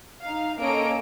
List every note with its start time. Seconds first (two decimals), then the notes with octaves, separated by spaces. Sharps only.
0.24 D#4 F5
0.61 A#3 C#4 A4 D#5 D7